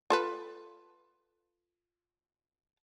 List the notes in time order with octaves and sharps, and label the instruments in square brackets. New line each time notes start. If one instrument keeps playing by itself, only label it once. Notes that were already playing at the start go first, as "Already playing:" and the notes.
[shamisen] F4 A4 B4